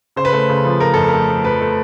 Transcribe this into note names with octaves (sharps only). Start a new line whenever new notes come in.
C#3 C5
B4
A3 C5
C#3
F3
A3 A#4
F2 A4
A#4
A3
A3
F2 B4
A3